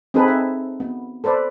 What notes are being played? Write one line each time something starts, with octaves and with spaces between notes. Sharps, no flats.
C4 D#4 G#4 A4 B4 A5
E5
B3
A4 B4 C5 D5